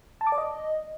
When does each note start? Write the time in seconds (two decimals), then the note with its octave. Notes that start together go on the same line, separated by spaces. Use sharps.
0.21 A5
0.27 D6
0.32 D5
0.38 D#5